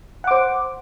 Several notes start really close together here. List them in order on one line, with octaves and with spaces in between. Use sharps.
F#5 D6 C5